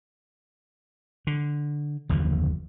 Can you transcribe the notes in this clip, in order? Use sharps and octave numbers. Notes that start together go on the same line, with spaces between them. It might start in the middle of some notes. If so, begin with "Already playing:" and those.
D3
F#1 D#2 D3 F3